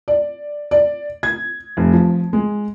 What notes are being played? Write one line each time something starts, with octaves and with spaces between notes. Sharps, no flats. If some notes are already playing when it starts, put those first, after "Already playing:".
D5
D5
G#6
F1
F3
G#3